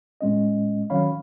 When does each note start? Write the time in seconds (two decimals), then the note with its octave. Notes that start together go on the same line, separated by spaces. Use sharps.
0.21 A2 G#3 C#4 D#5
0.90 D#3 F#3 C#4 C#5 F5 B5